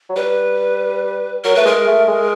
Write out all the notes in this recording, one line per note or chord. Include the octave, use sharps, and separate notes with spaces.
F#3
G3 B4
F#3 A#4
A3 B4
G#3 A#4
A3
G#3